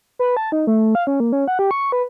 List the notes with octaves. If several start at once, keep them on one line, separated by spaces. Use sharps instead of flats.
B4
A5
D#4
A3
F5
C#4
A#3
C#4
F#5
G4
C#6
B4